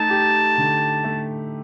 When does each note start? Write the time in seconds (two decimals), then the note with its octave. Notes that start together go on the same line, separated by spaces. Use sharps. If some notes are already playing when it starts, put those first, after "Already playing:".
Already playing: A3 D#4 A5
0.10 G4
0.58 D3
1.04 A3